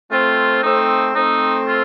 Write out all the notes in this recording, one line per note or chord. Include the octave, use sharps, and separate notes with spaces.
A3 C4 F4
A3 C4 D#4
A3 C4 D#4
F4